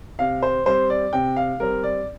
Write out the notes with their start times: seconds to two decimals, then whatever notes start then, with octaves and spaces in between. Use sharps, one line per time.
0.19 C3 F5
0.42 C5
0.66 G3 C4 C5
0.90 D5
1.13 C3 G5
1.36 F5
1.60 G3 C4 A#4
1.83 D5